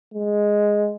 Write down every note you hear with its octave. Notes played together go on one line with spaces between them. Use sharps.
G#3